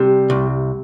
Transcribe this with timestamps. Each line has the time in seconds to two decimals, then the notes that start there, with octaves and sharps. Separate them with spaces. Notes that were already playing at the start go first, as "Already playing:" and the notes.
Already playing: C3 G3
0.30 C2